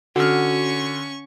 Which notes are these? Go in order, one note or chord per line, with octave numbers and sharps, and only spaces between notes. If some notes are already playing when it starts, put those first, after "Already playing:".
D3 C#4 F#4 C#6 F6